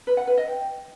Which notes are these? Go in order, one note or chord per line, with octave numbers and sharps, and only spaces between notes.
B4
F#5
B4
D#5
G5